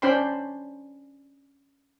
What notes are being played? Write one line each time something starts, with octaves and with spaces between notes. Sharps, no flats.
C#4 D4 C5 G5 B5 C6